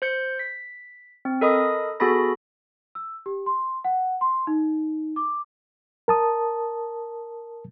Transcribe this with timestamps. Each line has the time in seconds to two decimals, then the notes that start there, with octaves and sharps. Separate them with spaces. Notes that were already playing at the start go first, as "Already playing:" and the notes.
0.02 C5 G6 C#7
0.39 B6
1.25 C4
1.41 A4 A#4 D#5 B5 D#6
2.00 B3 F#4 G#4 A4 B5 A#6
2.95 E6
3.26 G4
3.46 C6
3.84 F#5
4.21 C6
4.47 D#4
5.16 D6
6.08 A#4 A5 D#6